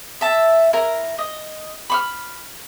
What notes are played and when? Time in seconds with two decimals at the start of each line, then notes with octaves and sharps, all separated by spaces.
0.21 E5 A5
0.73 E4 A#4 A#5
1.18 D#5
1.90 B5 C#6 F6